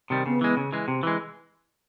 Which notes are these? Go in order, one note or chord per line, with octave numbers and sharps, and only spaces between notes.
C3 D#3 G3
C#3 B3
E3 G#3
C#3
E3 G#3
C3
E3 G#3